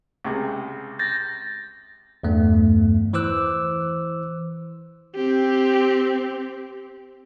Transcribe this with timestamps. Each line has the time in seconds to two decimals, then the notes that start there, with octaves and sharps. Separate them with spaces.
0.25 C#2 C3 G#4
0.99 G6 A6 A#6
2.23 E2 G2 A3
3.13 E3 C5 D6 E6 F#6
5.16 C4 G4